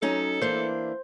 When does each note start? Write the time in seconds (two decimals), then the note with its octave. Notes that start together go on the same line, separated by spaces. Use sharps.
0.02 F#3 C#4 D#4 A4
0.41 E3 A#3 D4 C5